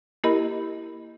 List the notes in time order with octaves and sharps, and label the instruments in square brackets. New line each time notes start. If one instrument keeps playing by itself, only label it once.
[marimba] A#3 E4 G4 A#4 D#5 B5